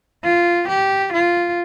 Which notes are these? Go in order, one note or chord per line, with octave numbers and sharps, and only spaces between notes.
F4
G4
F4